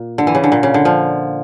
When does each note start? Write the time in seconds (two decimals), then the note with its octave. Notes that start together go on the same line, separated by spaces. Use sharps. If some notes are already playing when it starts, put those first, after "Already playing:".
Already playing: A#2
0.18 D3
0.27 E3
0.35 C#3
0.44 D3
0.52 A#2
0.63 C#3
0.74 D3
0.85 F3